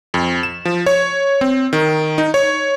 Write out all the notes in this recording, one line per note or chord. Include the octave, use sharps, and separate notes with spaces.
F2
E7
F3
C#5
C4
D#3
D#4
C#5